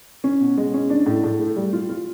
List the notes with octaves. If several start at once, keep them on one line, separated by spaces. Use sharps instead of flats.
C#4
B2
G#3
C#4
D4
A2
A2
A3
G3
F4
F4